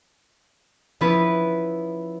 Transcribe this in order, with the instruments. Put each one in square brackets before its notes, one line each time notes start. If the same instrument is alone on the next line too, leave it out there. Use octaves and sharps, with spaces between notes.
[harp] F3 B3 C#4 E4 B4